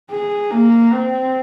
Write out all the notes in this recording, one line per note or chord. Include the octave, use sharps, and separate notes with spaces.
G#4
A#3
C4